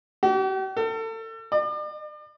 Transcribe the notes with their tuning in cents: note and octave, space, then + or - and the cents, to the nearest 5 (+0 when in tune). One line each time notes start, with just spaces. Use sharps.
G4 -45
A4 +35
D5 +40